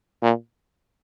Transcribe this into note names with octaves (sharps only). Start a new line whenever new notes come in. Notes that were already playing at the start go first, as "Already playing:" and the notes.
A#2